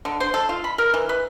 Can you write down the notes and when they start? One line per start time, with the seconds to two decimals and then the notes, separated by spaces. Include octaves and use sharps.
0.05 D3
0.20 C5
0.34 A4
0.49 F4
0.64 B5
0.78 A#4
0.94 E3
1.09 B4